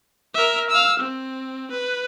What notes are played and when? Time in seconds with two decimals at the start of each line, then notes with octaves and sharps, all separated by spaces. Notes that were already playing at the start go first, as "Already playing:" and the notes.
0.34 A#4 E5
0.70 F5 E6
0.99 C4
1.71 B4